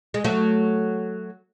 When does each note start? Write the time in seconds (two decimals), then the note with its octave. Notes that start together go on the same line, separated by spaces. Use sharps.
0.14 G#3
0.24 F#3 A3